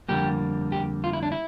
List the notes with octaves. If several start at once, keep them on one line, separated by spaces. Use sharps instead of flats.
F2 D3 G3 A#3 G4
G4
F4
E4
D4
E4